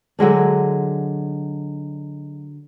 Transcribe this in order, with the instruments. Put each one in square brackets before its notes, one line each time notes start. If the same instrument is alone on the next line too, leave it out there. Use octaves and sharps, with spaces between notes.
[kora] D3 F#3 G#3 D4